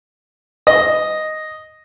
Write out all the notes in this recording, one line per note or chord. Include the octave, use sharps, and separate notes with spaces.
D#5